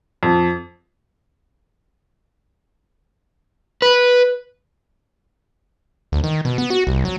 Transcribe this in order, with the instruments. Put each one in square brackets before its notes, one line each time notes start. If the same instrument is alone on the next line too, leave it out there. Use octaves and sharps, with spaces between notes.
[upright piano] F2
[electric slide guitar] B4
[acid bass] D2
D#3
B2
B3
F#4
C2
F#3